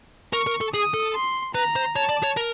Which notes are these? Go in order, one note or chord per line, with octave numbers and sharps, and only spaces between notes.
A#4 C#6
A#4
A4
G#4 D#6
A4
C6
B4 A#5
C5
C#5 A5
D5
C#5
A#4